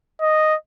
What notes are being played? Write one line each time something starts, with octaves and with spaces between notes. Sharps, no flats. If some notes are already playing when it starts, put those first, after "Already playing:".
D#5